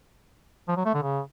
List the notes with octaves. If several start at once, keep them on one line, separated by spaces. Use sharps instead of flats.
F3
F#3
A3
D3
C#3